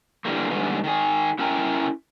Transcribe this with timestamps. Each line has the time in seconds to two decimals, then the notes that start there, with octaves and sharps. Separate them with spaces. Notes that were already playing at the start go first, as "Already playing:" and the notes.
0.25 D3 E3 G3 A#3
0.50 G#2 D3 E3 G3 B3
0.84 D#3 G#4
1.39 C#4 E4 A#4 G5 A5 A#5